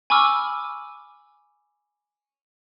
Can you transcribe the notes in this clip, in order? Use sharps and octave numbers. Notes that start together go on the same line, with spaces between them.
G#5 B5 C#6 D6 E6 F6